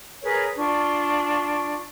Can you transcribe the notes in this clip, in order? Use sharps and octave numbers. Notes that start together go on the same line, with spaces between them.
G#4 A#4 B4 C#5
D4 F4 C#6